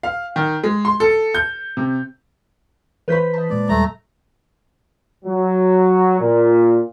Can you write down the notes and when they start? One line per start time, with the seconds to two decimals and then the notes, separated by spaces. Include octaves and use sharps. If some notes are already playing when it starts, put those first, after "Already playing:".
0.03 F5
0.36 D#3
0.64 G#3
0.85 C6
1.00 A4
1.34 G6
1.77 C3
3.08 E3 B4 C5 B5 G6 B6
3.34 D#5 A5
3.50 A#2 G#3 D5
3.69 D#2 G3 A3 A#5
5.25 F#3
6.20 A#2